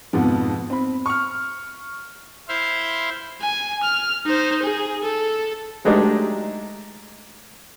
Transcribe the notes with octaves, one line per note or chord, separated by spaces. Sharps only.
F2 G#2 B2 F3 B3
C4 B5
C#6 F6
E4 C5 E5 F5 C6
G#5
F6
D#4 C5
G#4
A4
F#3 G#3 A3 D4 D#4 G4